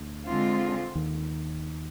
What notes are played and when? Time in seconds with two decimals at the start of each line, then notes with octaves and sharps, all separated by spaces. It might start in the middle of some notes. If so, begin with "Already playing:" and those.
Already playing: D2
0.26 D3 G#3 C4 F4
0.95 D#2 D#3